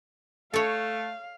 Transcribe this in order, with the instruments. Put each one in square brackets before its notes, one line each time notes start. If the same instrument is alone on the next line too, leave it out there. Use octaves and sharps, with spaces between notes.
[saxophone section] A3 [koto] A4 C#5 [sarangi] F5